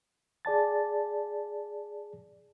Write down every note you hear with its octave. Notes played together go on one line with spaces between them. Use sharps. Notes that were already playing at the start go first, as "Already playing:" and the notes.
G#4 D5 A5 A6